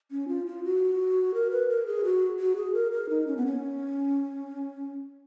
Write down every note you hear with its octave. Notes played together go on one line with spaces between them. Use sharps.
C#4
F4
F4
F#4
A#4
B4
A#4
G#4
F#4
F#4
G#4
A#4
A#4
D#4
C#4
B3
C#4